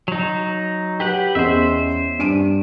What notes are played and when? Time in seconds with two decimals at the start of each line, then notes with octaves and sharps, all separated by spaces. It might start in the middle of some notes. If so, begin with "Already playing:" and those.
0.08 F#3 D#4
1.00 G4 B4 F#5
1.35 E2 C#4 C5 D#5 E5
2.19 G2 D7 D#7